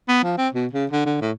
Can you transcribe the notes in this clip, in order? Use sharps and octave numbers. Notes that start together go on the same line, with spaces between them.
B3
F3
C4
B2
C#3
D3
D3
A2